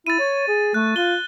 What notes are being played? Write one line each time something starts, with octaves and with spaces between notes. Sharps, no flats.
E4 A6 D#7
C#5
G#4
A3 F#6
F4 G7